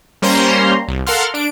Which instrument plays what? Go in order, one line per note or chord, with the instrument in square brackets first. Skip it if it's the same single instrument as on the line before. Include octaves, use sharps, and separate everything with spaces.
[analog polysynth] G3 A#3 C#4 C5 A#5 C6
C2
A4 A#4 F5 F#5 C6 F6
D4 D7